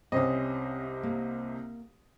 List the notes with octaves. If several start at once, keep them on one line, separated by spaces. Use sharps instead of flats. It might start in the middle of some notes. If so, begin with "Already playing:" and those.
C2 C3 C4 C#4 D#5
A#3